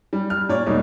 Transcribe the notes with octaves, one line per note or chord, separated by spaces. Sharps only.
G3
F6
A#2 C#5 D5
E1 G3 A#3 D#4